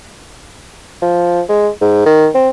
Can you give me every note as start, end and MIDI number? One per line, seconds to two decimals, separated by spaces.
1.02 1.41 53
1.49 1.69 56
1.81 2.02 44
2.06 2.28 51
2.35 2.49 60